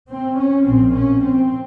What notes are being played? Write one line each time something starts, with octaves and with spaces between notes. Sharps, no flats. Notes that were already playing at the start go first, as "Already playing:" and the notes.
C4
C#4
A#1 A#2 C4
C#4
C4